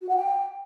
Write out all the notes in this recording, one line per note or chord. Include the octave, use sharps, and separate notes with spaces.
F#4
F#5
G5